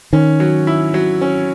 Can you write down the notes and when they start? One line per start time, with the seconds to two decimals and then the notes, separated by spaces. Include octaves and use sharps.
0.13 D#3 C#4
0.40 F#3
0.67 E4
0.94 F#3
1.21 C#4